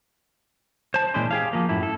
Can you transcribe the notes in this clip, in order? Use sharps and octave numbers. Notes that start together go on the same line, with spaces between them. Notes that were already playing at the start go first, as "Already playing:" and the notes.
C5 A5
A#2 E3 G#3 C#4 D4 C5
G4 G#4 F5
F3 A#3
F#2 A2 E4
A4